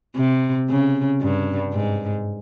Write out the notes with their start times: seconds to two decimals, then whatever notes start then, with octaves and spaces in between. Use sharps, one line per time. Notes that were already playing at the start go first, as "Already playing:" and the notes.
0.17 C3
0.69 C#3
1.21 G2
1.73 G#2